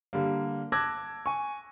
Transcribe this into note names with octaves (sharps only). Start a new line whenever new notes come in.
D3 G3 A#3
A5 D6 E6 F#6 G#6 A#6
G#5 C#6